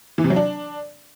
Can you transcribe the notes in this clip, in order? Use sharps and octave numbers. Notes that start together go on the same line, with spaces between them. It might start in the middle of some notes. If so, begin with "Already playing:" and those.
E3
C3
F#3
D4